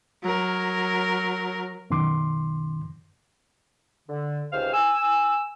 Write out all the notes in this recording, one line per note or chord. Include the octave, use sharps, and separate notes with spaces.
F#3 A#4
F#2 B2 D#3 C6 D6
D3
C#2 C3 D#3 C5 F5 F6
G#5 E6